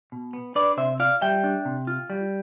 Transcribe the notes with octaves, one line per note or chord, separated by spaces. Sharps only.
B2
B3
D4 B4 D5
C3 C5 E5
F4 D5 F5
G3 E5 G5
D4
C3
F4
G3